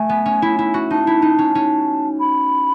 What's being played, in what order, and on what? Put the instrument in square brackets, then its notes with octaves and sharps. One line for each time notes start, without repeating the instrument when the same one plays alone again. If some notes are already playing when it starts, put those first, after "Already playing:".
Already playing: [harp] A3 [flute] G#5
[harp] B3
C#4
E4
E4
F#4
[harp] D#4 [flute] A5
[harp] E4
D#4
C#4
C#4
[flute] B5